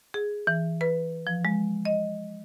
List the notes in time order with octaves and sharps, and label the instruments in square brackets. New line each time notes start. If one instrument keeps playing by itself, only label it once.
[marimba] G#4
E3
B4
F3
G#3
D#5